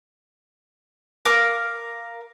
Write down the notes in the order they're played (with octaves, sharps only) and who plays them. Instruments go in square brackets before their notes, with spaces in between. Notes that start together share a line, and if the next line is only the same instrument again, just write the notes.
[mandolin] A#4 F5 D6